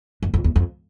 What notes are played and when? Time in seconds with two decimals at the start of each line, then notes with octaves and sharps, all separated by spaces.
0.23 F#2
0.34 F2
0.44 E2
0.56 F2